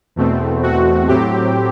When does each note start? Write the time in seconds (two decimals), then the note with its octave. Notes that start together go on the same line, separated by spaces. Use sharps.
0.16 E2 B2 A3 C4
0.63 F#4
1.08 A2 F#3 C4 G4